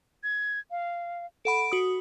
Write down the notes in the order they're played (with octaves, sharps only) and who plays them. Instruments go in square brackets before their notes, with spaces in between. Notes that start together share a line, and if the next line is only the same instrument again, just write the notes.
[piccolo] G#6
F5
[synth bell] A4 F#5 B5 [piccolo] D7
[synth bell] F#4 D#6